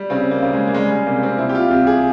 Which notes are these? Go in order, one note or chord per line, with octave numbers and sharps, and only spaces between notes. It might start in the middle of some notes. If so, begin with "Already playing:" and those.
Already playing: G3
C#3 C4
A#3
C#3
G#3
A#3
G3 G#3
G#3
C3 A#3
C4
C3 E4
G4
F4
C2 G4
G#4